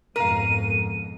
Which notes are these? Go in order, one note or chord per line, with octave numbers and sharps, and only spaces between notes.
F2 G#2 B2 A#4 F5 D#7